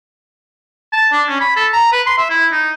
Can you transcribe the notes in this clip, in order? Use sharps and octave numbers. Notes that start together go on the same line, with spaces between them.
A5
D4
C#4
B5
A4
A#5
B4
C6
E5
E4
D#4